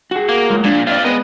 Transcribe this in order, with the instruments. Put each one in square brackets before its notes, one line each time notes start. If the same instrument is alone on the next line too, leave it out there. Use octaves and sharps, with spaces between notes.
[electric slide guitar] F#4 G#4
[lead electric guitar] A#3
[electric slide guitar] F#3 G#3 F4
[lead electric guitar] A#2 [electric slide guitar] F3 D4
[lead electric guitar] C4 F4 [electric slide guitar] D5 E5 F5
[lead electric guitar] G#3 D#5 [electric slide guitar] B3 B4